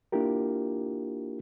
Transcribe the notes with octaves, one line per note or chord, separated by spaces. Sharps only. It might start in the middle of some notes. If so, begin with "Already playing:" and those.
A#3 D4 E4 F4 G4 A#4